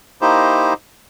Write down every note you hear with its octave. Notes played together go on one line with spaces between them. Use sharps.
A#3 D#4 E4 G4 C5